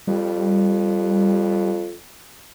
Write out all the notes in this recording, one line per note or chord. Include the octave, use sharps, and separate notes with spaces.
F2 G3